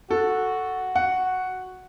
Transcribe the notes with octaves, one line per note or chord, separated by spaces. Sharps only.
F#4 A4
F#5